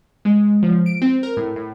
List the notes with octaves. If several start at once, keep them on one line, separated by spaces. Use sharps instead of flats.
G#3
F3
D7
C4
A#4
A2
A2